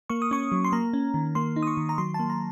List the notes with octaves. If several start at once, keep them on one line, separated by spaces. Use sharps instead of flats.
A#3 C#6
D#6
C#4 C#6
F#3
C6
A#3 A#5
C#4
D#3
A#3 C6
D#4
D#6
C#6
D#3
A#5
F#3 C6
A5
A#3
A#5